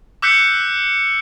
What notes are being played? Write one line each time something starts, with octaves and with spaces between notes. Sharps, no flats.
D6 E6 F#6 G6 B6 C#7